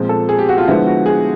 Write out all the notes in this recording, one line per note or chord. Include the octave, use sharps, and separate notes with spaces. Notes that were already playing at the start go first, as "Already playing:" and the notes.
Already playing: A#2 F3 G#3 C4
A4
G#4
G4
F#4
F4
D3 F3 G#3 B3 E4
F#4
G#4